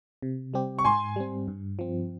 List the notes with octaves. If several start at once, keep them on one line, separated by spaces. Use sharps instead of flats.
C3
G3 C4 G4
C#6
G#2 G#5 C6
G3 C4
G2
F3 C4